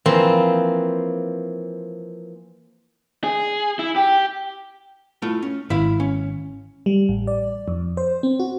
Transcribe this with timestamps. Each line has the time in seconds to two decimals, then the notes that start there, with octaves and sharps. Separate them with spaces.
0.06 E3 F3 A#3 C4
3.24 G#4
3.79 E4
3.96 G4
5.22 A3 E4 F4
5.42 C#4
5.70 G#1 E4 E5 F5
6.00 C#4
6.86 G3
7.09 A1
7.27 D5
7.68 F2
7.97 C5
8.23 C4
8.40 F#4